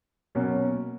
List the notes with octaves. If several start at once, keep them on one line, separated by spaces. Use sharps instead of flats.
B2 F#3 A#3 C#4